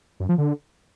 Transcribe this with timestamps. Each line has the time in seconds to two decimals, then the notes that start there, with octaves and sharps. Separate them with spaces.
0.20 F#2
0.29 F3
0.38 D3